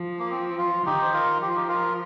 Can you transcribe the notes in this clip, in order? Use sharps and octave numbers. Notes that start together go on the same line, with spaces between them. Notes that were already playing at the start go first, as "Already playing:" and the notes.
Already playing: F3
A#3
C4
F4
D#3 D#4 G4
C5
F4 A#4
F3 G4
F4
D#4 G4
F4 A#4